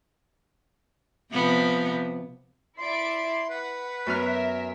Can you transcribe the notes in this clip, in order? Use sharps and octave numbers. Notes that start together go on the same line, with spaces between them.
C3 F3 B3
E4 D5 C6 D7
B4 F#5
F#2 B3 A#4 E5 F6